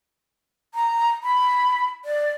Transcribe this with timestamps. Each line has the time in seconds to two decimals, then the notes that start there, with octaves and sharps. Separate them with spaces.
0.74 A#5
1.23 B5
2.05 D5